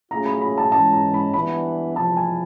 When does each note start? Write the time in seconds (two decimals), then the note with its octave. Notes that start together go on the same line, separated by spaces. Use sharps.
0.11 F#3 A3 C#4 F4 G#4 A#5
0.26 B5
0.41 B5
0.58 A5
0.72 G#2 E3 G#3 C#4 A5
0.93 A#5
1.14 B5
1.34 E3 G3 B3 D4 B5
1.96 E2 C3 F3 A5
2.17 G#5